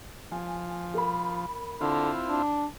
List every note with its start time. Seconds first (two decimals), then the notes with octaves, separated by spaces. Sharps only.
0.31 F3 G#5
0.94 A#4 B5
1.81 D3 C4 E4 F4
2.30 D4